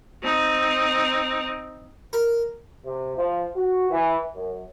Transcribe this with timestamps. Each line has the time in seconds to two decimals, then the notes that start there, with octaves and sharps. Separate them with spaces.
0.23 C4 D#4
2.13 A#4
2.85 C3
3.18 F3
3.56 F#4
3.91 E3
4.35 F#2